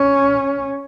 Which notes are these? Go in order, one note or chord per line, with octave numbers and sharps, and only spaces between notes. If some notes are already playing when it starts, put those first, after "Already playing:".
Already playing: C#4